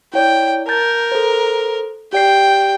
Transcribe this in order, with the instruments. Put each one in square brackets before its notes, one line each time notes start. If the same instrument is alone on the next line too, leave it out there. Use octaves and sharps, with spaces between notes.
[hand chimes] E4 C#5 D5 [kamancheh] G5
[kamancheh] A#4 [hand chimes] A5 G6 A6
[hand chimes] A4 C5
[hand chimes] G4 D5 C7 [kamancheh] G5